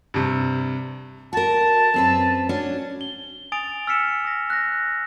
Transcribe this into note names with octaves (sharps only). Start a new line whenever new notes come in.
G2 C3
F#4 A#4 A5
F#2 C4 B4
C#4 D4 F#4
G7
G#5 D#6 A6 D7 F7
E6 F6 B6 C#7 E7
D#6 A#6
F#6 A#6